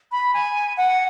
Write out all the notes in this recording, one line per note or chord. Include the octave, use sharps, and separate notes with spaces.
B5
G#5
F#5